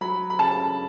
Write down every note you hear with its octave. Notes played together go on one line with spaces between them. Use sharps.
F#3 B5
B5
C#3 A5